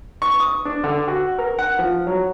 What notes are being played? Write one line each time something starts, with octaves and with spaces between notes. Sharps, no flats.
C#6
D#6
D4
D3
F#4
A#4
F#5
F3
F#3